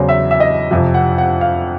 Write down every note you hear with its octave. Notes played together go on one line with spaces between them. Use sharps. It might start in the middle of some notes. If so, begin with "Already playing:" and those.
Already playing: E2 C#3 F#3 C5
E5
E5
D#5
F2 C3 F3 E5
F#5
F#5
F5